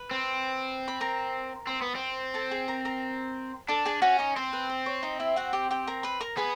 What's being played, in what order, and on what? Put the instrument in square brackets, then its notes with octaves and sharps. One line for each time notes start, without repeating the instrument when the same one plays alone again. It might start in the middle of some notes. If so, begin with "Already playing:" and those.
Already playing: [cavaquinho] B4
[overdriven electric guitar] C4
[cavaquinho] B5
A#4 A#5
[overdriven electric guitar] C4
B3
C4
[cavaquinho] A4 A5
G#4 G#5
A#4 A#5
A#4 A#5
[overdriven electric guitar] D4 [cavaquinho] A4 A5
[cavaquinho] G#4 G#5
[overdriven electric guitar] C#4 [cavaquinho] F#4 F#5
[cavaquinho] D#4 D#5
[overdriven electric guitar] C4 [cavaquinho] C5
[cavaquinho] B4
C5
C#5
D#4 D#5
E4 E5
F#4 F#5
G4 G5
G4 G5
A#4 A#5
B4 B5
A#4 A#5
[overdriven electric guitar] B3 [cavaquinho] G#4 G#5